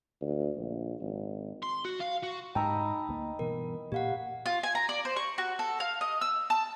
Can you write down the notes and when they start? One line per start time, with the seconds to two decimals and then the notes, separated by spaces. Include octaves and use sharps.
0.21 D2
0.57 A#1
1.00 G#1
1.63 C6
1.85 F#4
2.00 F5
2.23 F#4
2.55 G#2 D#4 B4 G5 A5 A#5 E6
3.08 D2 A#3
3.39 G2 B2 E3 A#4
3.92 A#2 A#3 G4 F5 F#5
4.46 F4
4.63 G#5
4.75 A#5
4.89 D5
5.05 C5
5.16 C#6
5.38 F#4
5.59 A4
5.80 F5
6.01 D#5
6.21 E6
6.50 A5